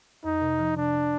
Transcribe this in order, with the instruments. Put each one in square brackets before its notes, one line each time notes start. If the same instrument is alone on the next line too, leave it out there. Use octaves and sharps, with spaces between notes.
[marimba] F2 [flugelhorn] D#4
[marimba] C3
F3
[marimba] C3 [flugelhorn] D4
[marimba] C3